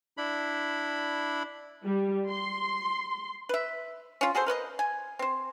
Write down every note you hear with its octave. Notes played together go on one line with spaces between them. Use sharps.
D4 E4 B5
G3
C6
B4 E5
C#4 F4
F#4 G#4 A4 C5
A#4 B4 C#5 D#5
G#5
C4 C5